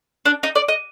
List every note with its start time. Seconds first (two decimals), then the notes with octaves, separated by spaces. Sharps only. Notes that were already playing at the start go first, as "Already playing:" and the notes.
0.25 D4
0.43 D#4
0.55 D5
0.68 D#5